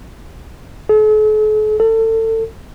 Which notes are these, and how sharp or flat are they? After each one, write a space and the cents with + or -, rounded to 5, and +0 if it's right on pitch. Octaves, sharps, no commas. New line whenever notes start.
A4 -45
A4 +30